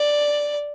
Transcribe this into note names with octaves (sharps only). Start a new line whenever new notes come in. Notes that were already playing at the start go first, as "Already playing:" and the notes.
Already playing: D5